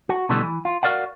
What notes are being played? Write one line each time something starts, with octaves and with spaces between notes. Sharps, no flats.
F#4
B2 D3 E3 G3 A3
E3
F4
F#4 A#4 D5 F5 F#5